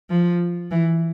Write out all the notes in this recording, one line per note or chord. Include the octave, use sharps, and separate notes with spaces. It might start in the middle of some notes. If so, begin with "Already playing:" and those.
F3
E3